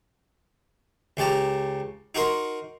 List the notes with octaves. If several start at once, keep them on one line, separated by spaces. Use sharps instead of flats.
C#2 C#4 G4 A5 A#5
D#4 F#4 A#4 C6